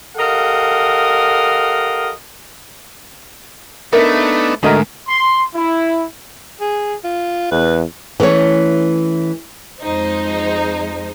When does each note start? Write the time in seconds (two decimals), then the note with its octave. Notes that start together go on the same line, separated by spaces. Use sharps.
0.17 G4 A4 A#4 D#5 F5 F#5
3.93 A3 B3 D4 D#4 A#4 E5
4.63 G#2 D3 A3 F#4 A#4 D#5
5.08 C6
5.55 E4
6.61 G#4
7.04 F4
7.51 E2 B4
8.20 E3 A3 C#4 C#5
9.82 F2 G#3 D#4 C5